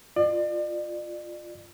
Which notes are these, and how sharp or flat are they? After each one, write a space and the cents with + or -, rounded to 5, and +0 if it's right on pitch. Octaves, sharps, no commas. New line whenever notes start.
F4 +0 D5 +35